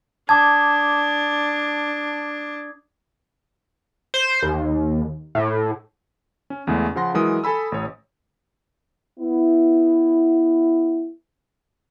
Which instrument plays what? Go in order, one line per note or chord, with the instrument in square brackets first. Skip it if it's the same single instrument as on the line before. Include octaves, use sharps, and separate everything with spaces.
[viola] D4 [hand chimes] A5 [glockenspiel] D6 D#6 G#6
[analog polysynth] C5
D#2
A2
[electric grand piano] C#4
E2 C#3 G#3 A3
C#3 F3 F#5 C6 A#6
E3 F#3 G#3 A#4 D#6
A4 G#5 B5 E6
A1 C#5
[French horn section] B3 E4